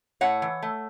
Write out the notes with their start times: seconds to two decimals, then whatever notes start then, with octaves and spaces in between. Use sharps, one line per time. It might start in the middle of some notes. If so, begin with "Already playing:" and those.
0.21 A2 C#5 F#5
0.42 E3
0.62 A3